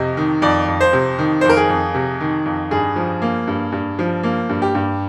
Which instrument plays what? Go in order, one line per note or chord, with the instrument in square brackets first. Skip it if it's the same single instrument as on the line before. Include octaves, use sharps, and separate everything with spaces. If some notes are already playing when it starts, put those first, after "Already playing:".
Already playing: [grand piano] F2 C3 D#5
D#3
F2 D5
F2
C5
C3
D#3
C5
F2 A#4
G#4
F2
C3
D#3
F2
G2 G#4
F3
A#3
G2
G2
F3
A#3
G2
G4
G2